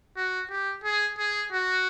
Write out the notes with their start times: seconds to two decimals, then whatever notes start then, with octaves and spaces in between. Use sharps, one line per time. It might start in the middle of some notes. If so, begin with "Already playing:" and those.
0.16 F#4
0.50 G4
0.84 G#4
1.18 G#4
1.52 F#4